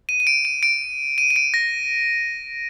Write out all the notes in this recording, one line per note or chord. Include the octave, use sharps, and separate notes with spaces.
D#7
D#7
D7
D#7
D7
D#7
D#7
D7
A#6